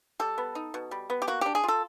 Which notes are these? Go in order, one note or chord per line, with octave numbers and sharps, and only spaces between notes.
G3 A4
B3
D#4
B2
G3
B3
G4
A#3 F#4
D4 G4
G#4
F4 A4